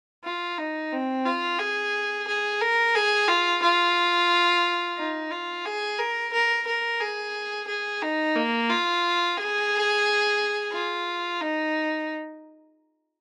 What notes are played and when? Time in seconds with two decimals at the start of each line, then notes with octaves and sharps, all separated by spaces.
0.24 F4
0.58 D#4
0.92 C4
1.25 F4
1.59 G#4
2.28 G#4
2.61 A#4
2.95 G#4
3.28 F4
3.62 F4
4.98 D#4
5.31 F4
5.65 G#4
5.99 A#4
6.33 A#4
6.67 A#4
7.00 G#4
7.67 G#4
8.02 D#4
8.35 A#3
8.69 F4
9.37 G#4
10.72 F4
11.41 D#4